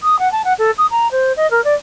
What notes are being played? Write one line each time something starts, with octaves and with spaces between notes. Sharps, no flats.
D#6
F#5
A5
F#5
A4
D#6
A#5
C5
D#5
A#4
D5